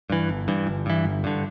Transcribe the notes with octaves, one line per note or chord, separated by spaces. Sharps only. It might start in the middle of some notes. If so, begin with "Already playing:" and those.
G2 E3
G1
G2 E3
G1
G2 E3
G1
G2 D3